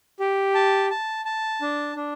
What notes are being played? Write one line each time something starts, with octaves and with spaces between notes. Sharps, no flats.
G4
A5
A5
A5
D4
D4